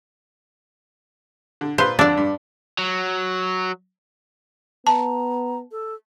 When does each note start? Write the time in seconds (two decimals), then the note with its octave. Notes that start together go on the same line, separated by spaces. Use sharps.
1.61 D3
1.78 A#2 B4 C5 C6
1.99 F2 D3 D4 D5 E6
2.17 G2
2.78 F#3
4.87 B3 A5 A#5
5.71 A4